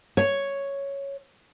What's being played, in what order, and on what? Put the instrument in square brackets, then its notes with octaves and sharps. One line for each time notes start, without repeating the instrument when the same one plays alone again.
[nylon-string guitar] C#5